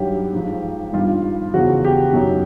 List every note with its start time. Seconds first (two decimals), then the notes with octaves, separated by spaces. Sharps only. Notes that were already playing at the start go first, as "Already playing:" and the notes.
Already playing: G2 D#3 F#3 G4
0.33 G#2 F3
0.93 G2 D#3 G3 F4
1.53 E2 C#3 F3 F#4
1.85 G4
2.13 F#2 D#3 F#3